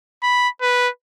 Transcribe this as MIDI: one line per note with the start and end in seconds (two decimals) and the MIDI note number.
0.23 0.48 83
0.62 0.89 71